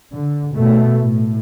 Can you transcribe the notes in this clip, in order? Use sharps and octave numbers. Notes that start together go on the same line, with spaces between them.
D3
B2 A3
A2